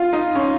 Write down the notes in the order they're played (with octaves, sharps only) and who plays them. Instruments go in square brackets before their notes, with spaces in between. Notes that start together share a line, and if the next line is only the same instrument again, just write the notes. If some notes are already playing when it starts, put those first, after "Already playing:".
Already playing: [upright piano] F4
D#4
C#4